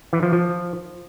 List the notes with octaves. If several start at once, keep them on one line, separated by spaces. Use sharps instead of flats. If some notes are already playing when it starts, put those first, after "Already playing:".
E3
F3
F3